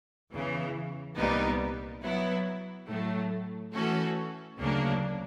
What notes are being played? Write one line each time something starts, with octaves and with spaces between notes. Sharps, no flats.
E2 C#3 E3
C2 A#2 G3 B3 D#4
F#3 B3 E4
A2 F#3 A3
E3 A3 C#4 F#4 A4
D2 C#3 F#3 A#3 D4